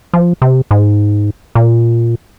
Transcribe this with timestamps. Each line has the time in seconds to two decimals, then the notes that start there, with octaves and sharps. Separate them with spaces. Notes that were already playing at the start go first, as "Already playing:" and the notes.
0.14 F3
0.42 C3
0.71 G#2
1.55 A#2